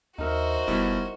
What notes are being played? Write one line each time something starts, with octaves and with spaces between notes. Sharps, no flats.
D#2 D#4 F#4 A#4 C5 E5
F#1 B2 G3 E4